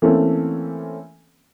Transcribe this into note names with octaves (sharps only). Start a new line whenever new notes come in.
E3 A3 A#3 C4 C#4 A4